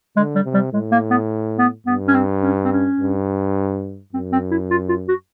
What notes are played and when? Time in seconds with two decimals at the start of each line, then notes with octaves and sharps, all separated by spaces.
0.17 D3 G#3
0.35 G3
0.44 C3
0.54 G3
0.73 A2 G#3
0.92 A#3
1.11 B3
1.59 B3
1.86 G2 B3
2.08 C#4
2.15 C4
2.43 C#4
2.65 C4
2.72 C#4
3.00 G2
4.13 F#2 C4
4.32 C4
4.51 E4
4.71 F4
4.89 F4
5.08 F#4